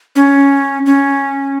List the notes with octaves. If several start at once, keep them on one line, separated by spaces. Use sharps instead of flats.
C#4
C#4